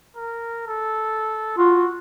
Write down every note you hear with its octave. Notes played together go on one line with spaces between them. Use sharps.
A#4
A4
F4 F#4